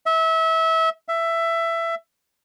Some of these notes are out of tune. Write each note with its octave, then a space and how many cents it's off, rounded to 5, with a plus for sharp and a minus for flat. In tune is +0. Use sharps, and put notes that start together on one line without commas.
E5 -25
E5 +15